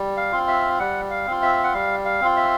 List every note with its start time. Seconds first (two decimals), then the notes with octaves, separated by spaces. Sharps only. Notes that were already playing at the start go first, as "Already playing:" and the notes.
Already playing: G3
0.17 F5
0.32 C4 F4
0.48 E5
0.79 G3 F#5
1.10 F5
1.27 C4 F4
1.42 E5
1.64 F#5
1.74 G3 F5
2.05 F5
2.21 C4 F4
2.37 E5